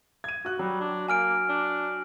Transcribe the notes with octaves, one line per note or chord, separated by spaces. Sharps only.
G#6 D#7
F#4 F#6
F#3 G3
D4
A#3 G#5 F6 D7
D4